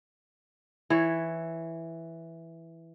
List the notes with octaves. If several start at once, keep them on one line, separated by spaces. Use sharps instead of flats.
E3 C#5